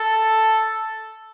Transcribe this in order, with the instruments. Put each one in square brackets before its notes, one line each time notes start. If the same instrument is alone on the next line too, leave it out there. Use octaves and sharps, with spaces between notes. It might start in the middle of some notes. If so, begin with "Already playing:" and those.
Already playing: [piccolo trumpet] A4